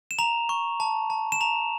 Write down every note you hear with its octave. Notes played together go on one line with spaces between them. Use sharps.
E7
A#5 F7
C#6
A5
A5
E7
A#5 F7